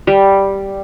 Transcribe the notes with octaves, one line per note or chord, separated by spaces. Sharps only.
G3